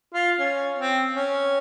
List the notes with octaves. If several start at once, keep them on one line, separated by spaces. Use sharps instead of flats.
F4
C#4
C4
C#4